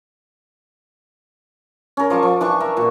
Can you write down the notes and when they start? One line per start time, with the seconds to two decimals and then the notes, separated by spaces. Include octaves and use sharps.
1.97 C#4 A#4
2.10 F3 D5 A5 C#6
2.23 F3
2.41 E3 D4 C#6
2.60 A#4 E5
2.77 A#2 F#4